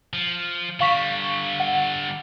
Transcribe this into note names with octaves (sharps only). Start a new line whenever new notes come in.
F3
D3 G3 F5 C#6 B6
F#5